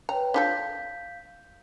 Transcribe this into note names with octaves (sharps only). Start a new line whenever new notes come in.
B4 C#5 G5 A#5
D4 F4 A4 F5 G6 B6